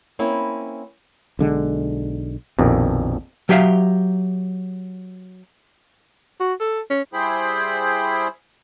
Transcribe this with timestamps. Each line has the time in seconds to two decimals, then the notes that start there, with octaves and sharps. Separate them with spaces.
0.19 A#3 C4 C#4 E4
1.39 B1 D3 G#3
2.59 A#1 F2 B2 D#3
3.49 F#3 G4 E5 F5
6.40 F#4
6.60 A4
6.90 C#4
7.13 G3 E4 G#4 C5 G5 B5